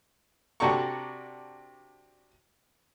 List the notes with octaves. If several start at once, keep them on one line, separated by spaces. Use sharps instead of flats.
C3 D4 F#4 A4 A#5 C#6